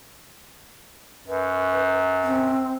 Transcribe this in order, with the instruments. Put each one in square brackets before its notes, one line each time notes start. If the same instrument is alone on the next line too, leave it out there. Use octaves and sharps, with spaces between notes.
[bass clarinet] F#2 [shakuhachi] B4
[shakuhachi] C4